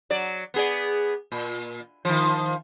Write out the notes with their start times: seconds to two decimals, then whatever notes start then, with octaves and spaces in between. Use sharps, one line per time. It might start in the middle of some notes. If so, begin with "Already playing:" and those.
0.10 F#3 D5
0.54 B3 G#4 D5
1.32 A#2
2.05 D#3 F3